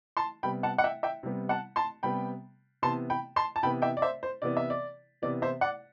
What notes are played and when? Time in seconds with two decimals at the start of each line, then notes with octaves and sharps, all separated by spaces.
0.17 A5 C6
0.43 C3 G3 B3 G5 B5
0.63 F#5 A5
0.78 F#5
0.84 E5 G5
1.03 E5 G5
1.23 C3 G3 B3
1.49 F#5 A5
1.76 A5 C6
2.03 C3 G3 B3 G5 B5
2.82 C3 E3 B3 A5 C6
3.10 G5 B5
3.36 A5 C6
3.56 A5
3.63 C3 E3 B3 G5 B5
3.82 E5 G5
3.97 D5
4.02 C5 E5
4.23 C5
4.42 C3 E3 B3 D5
4.57 E5
4.70 D5
5.22 C3 E3 B3 D5
5.42 C5 E5
5.61 D5 F#5